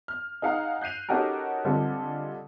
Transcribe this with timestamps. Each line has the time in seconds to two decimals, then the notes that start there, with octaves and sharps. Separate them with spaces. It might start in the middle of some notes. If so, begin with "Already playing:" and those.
0.08 F6
0.42 D#4 G#4 F5 F#5 A#5
0.81 F#6 G6 C7 D#7 F7
1.09 C#4 D#4 F#4 G4 A4 A#4
1.65 D3 G3 G#3 C4 F4 A4